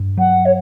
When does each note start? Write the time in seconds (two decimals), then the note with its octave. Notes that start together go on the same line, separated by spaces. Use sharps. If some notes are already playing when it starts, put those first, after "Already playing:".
Already playing: G2
0.17 F#3 F#5
0.45 C#5